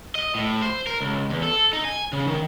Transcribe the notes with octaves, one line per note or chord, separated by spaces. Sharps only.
D#5
A2
C5
A#4
C#2
E2
A4
D#4
G#5
C#3
D#3